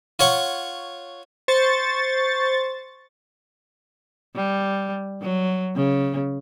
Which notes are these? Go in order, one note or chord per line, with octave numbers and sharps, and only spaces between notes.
F4 C#5 F#5 C#6
C5 C#6 A6
G3
F#3
C#3